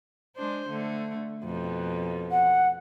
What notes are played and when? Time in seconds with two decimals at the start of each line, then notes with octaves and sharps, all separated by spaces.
0.36 G#3 D4 C5
0.70 D3 A3
1.44 F2 B2
2.31 F#5